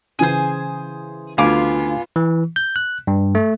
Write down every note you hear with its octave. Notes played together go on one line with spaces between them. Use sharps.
C#3 E3 G#4 C5 G#6
D2 B3 F4 F5 G#5 D6
E3
G6
F#6
G2
A3